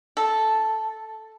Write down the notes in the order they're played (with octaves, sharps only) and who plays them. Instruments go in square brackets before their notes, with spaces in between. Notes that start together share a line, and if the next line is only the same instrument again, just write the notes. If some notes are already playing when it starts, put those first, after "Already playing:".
[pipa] A4